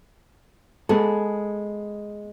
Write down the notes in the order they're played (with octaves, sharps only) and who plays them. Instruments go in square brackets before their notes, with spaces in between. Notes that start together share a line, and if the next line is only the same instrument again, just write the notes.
[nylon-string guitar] G#3 [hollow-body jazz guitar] B3 G#4 A4